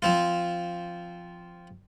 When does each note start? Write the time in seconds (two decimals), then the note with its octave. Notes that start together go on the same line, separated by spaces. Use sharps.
0.02 F3 C4 F4